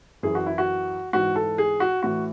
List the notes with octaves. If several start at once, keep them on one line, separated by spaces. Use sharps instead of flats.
F#2 E3 G#4
F#4
E4
F#4
G#2 E3 F#4
A4
G#4
F#4
A2 E3 F#4